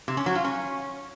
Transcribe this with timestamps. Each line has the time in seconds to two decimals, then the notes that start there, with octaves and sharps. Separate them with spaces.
0.08 C3
0.17 C#4
0.26 F#3
0.35 F4
0.44 C#4